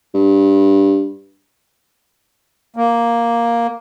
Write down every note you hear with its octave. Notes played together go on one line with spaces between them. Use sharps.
G2
A#3